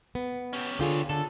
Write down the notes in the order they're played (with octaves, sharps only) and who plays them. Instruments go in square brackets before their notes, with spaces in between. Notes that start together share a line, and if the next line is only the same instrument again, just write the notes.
[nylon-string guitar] B3
[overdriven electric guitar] C#4 G4
[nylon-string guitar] D3 F4 G#4 [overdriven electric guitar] G4 C#5
[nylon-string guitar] D3 [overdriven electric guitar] A4